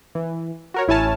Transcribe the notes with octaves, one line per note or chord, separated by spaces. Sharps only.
E3
F#4 A#4 C#5
A1 E4 C#5 G#5 A5 F6